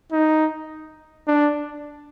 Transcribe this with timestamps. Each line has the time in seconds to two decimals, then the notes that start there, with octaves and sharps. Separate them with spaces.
0.12 D#4
1.27 D4